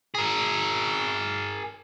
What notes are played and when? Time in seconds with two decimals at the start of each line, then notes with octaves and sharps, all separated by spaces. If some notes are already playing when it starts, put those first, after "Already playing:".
0.15 G#4 A#4